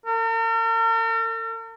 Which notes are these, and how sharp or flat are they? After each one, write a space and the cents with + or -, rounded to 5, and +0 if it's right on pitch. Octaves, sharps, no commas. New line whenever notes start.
A#4 -45